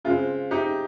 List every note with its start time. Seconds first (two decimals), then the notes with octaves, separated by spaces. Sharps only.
0.05 C#3 G#3 C4 F4
0.51 D#4 G4